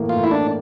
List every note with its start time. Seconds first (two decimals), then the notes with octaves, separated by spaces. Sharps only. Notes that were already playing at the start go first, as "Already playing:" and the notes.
Already playing: A2 E3 A#3
0.09 F4
0.16 A2
0.24 E4
0.31 D4